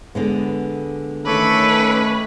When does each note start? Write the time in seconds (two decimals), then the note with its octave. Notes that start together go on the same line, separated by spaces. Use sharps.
0.15 D3 G#3 B3
1.26 D#3 A3 C#4 A4 B4 C#5 D6